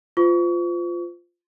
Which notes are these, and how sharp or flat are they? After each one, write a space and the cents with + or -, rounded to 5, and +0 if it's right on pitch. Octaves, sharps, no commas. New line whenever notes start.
F4 +0 C5 -40 C#6 +35